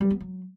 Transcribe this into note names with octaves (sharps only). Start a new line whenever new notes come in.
G3
B3
F#3